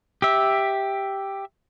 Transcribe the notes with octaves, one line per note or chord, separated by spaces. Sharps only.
G4 E5